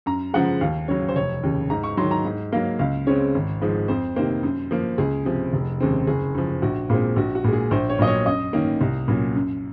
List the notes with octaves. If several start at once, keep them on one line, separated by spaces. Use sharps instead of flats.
F#2 A#5
C#3 F3 G#3 F#5
D#2 F5
C#3 F#3 C#5
C5
F1 C#5
D#2 C#3
G#2 A#5
C#6
D#3 F#3 C6
A#5
G#2
F#3 A#3 F5
C#2 F5
C#3 G#3 C4 C#5
G#1
G#2 F3 G#3
F2 C5
C3 D#3 A#3 C5
F#2
F3 A#3
C#2 G#4
C3 F3
F1
D#2 C#3 G#3 C4
F#1 G#4
F#2 F3
A#1 F#4
A#2 G#3 C4 F4
A#1 F#4
F#4
A#2 G#3
G#4
A#1 C5
C#5
A#2 F#3 D#5
C#5
F#2 D#5
D#3 A#3 C#4
C2
A#2 F#3 C#4
F#2